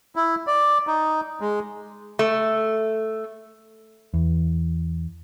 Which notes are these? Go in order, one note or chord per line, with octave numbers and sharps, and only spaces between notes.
E4
D5
D#4
G#3
A3
E2